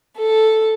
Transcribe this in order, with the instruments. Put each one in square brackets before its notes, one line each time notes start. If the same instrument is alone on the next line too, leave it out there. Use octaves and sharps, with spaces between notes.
[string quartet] A4